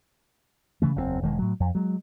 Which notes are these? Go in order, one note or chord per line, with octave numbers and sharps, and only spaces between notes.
C#3 E3 A3
F#1 E2 G2 C4
E1 D#3 G#3
A2 F#3
F2
F#3 G#3